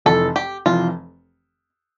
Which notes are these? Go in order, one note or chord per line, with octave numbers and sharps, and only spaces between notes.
F1 F2 E3 A4
G4
F1 F2 E3 F4